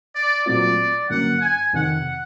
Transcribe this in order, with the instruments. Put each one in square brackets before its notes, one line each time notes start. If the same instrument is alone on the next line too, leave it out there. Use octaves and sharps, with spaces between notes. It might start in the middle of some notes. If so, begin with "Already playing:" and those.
[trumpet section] D5
[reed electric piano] A#2 F#3 A3 C4 F4 [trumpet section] D5
[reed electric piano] G2 D3 F#3 A#3 C#4 [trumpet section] F#5
[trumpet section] G#5
[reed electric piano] F2 C3 D#3 [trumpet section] F#5